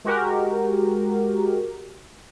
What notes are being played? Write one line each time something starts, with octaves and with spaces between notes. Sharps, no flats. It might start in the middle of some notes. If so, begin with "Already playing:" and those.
G#3 F#4 G4 A#4